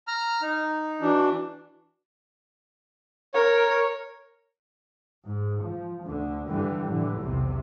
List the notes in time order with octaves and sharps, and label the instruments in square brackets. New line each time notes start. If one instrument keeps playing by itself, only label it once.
[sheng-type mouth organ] A#5 F6
D#4
[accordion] E3 D4 [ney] F#4
[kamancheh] A#4 [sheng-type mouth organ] C#5
[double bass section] G#2
F3
D2 D3
G2 D3 E3 G3
A2 D3 E3
B1 E2 C3